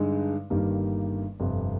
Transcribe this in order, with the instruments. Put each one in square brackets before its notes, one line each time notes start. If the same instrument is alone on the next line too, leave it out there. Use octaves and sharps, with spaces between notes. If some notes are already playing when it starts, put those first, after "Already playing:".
Already playing: [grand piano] G2 D3 G#3 D#4
G1 G2 D#3 G3 A#3
G1 F2 C3